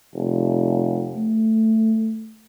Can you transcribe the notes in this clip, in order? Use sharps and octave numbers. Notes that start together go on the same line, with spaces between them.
F1
A3